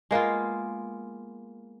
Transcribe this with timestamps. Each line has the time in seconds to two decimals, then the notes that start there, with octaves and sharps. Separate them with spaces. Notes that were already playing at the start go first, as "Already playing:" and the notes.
0.11 G#3 A#3 B3 F4